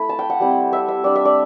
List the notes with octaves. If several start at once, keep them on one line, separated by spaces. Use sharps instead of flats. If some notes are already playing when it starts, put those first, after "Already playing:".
Already playing: A3 E4 B5
A5
G5
F#5
G3 C4 E4
E5
E5
G3 D4 D5
E5
D5